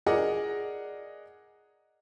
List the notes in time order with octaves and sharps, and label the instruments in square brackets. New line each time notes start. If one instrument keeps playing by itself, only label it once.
[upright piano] G#4 A#4 D5 D#5 F#5